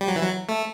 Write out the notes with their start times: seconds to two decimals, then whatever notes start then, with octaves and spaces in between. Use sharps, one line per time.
0.01 G3
0.08 F#3
0.16 E3
0.23 F#3
0.49 A3